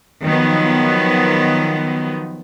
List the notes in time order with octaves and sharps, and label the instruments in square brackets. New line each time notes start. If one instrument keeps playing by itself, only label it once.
[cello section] D#3 F3 F#3 B3